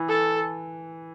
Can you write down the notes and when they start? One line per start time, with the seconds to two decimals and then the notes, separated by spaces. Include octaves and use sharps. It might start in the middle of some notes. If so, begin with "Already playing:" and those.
Already playing: E3
0.09 A4